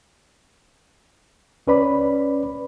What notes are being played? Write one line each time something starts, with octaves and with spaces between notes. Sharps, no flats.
C#2 C#4 B4 D5 B5